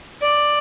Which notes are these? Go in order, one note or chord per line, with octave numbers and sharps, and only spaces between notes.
D5